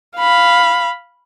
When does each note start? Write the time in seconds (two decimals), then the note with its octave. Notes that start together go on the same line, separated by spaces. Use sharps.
0.17 F5 B5